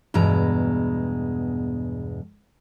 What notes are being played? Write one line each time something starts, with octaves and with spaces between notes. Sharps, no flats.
E2 G2 B2 G#3 A#5